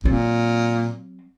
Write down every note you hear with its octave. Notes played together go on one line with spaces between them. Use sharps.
A#2 F#3 C4